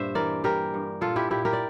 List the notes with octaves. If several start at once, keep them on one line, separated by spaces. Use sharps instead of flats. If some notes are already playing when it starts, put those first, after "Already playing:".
Already playing: G2 A#2 C5 E5
E3 A#4 D5
G3 G4 A#4
G2
A#2 F4 A4
E4 G4
A#2 E4 G4
G4 A#4
D5